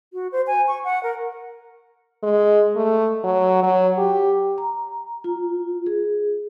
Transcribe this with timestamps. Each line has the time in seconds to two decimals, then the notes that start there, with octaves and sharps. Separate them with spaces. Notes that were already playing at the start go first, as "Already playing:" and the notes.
0.13 F#4
0.32 C5
0.47 G#5
0.68 C#6
0.84 F#5
1.03 A#4
2.23 G#3
2.76 A3
3.24 F#3
3.63 F#3
3.98 G4
4.58 A#5
5.24 F4
5.86 G#4